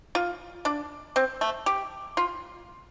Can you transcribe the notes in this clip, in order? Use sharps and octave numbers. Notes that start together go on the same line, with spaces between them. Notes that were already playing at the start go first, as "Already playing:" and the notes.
F4
D4
C4
A3
G4
F4